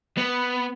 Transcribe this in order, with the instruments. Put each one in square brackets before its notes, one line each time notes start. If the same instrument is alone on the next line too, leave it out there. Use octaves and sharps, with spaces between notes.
[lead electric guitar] B3